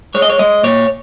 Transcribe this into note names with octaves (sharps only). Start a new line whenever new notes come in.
G#3 C#5
D#5
C#5
G#3 D#5
A#2 C#5